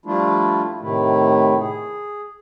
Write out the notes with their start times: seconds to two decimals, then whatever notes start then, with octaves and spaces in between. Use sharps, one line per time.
0.06 F3 G3 A3 D4 E4 F4
0.81 A2 C3 D#3 A3 E4
1.59 G#4